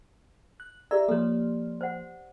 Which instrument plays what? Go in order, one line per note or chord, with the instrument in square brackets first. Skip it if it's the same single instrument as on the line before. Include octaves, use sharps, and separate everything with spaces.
[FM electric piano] F#6
[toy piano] G4 A4 D5 [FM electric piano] E5 A#5 E6
[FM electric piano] F3 A#3 [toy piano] A4 C#5
[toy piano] C5 F#5